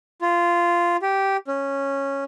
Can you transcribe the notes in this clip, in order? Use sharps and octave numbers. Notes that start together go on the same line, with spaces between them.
F4
G4
C#4